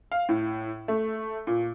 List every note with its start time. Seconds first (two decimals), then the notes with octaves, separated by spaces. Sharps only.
0.12 F5
0.29 A2
0.88 A3
1.47 A#2